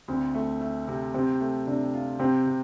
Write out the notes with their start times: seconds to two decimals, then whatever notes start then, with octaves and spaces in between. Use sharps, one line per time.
0.08 D2 C4
0.34 A3
0.61 A3
0.88 C3
1.14 C3 C4
1.41 A3
1.67 C3 D4
1.94 F4
2.19 C3 C4
2.47 C3